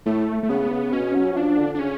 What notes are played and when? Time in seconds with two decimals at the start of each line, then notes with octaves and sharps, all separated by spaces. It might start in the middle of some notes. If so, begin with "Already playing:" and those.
0.06 A2 A3
0.43 A3
0.49 C#3 B3
0.71 C#3
0.92 B2 C#4
1.15 F#3
1.32 F#3
1.36 F3 D4
1.57 D3
1.75 D4
1.79 C#3 C#4